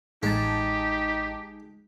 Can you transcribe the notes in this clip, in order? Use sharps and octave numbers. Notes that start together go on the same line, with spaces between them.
A1 G#3 D#4 G4 A5